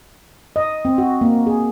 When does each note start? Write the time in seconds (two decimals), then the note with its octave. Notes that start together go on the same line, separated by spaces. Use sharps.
0.56 D#5
0.85 C4
0.98 F#4
1.21 A#3
1.47 G#4